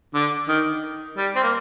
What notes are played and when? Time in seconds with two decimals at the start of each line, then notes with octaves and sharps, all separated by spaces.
0.14 D3
0.48 D#3
1.17 G3
1.35 C4
1.43 A#3